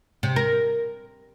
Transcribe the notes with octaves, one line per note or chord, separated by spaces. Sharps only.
C3
A#4